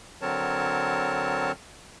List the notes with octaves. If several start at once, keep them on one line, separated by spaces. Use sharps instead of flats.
D3 F#3 C4 A#4 C#5 A5